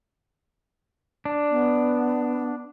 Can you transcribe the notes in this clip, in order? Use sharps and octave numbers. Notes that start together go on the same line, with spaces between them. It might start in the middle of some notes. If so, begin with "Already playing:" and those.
D4
B3